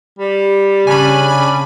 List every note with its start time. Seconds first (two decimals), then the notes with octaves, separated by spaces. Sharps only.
0.19 G3
0.87 C#3 C#4 D4 G#5 B5